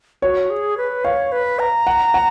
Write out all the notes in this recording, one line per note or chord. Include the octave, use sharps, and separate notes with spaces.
F#4 C#5
G#4
B4
C#5 F5
B4
A#5
F#5
F#5